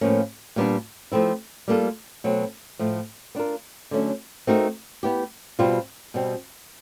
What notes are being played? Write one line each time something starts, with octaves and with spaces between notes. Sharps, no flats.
A2 F3 A#3 C#4
A#2 G3 B3 D4
F3 A3 C4 E4
G3 A#3 D4 F4 A4
B2 F#3 A3 C4
A2 F3 A3
B3 D4 F4 A#4
D3 F#3 A3 C#4
A3 C4 D#4 F#4 A#4
B3 E4 G4
B2 G3 C4 F4
B2 G3 C4